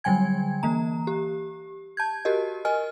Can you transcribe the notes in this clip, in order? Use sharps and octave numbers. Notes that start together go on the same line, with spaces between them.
D3 F#3 G3 G5 G#5 G#6
E3 A#3 A#5
G4
A5 G6 G#6
F#4 G4 A#4 D#5
A#4 D#5 G#5 F6